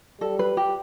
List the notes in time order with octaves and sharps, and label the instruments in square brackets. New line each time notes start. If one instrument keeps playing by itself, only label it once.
[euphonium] G3 [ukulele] A4
[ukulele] B4
G4